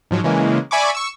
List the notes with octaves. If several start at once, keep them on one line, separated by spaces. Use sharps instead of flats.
G#2 F3 F#3
C#3 E3 G#3 A#3
D5 E5 G#5 B5 C#6 D6
C#6 E6